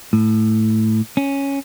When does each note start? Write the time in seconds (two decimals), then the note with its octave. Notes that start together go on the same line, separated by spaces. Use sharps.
0.13 A2
1.17 C#4